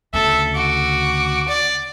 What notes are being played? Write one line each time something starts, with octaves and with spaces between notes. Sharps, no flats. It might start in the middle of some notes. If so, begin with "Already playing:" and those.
D2 C#3 A4 E5
F#4 D6
D5